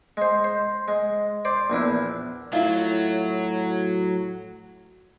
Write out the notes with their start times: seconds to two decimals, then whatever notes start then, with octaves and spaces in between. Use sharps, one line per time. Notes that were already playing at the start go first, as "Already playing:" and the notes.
0.17 G#3 C5
0.44 C5
0.88 G#3
1.45 C5 D5
1.70 A#1 E2 D4 E4
2.53 A2 F#3 E4 F4